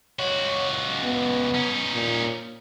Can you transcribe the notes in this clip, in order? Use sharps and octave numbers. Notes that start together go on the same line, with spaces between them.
C#2 F#4 C#5
B3
C#4 D#4
A#2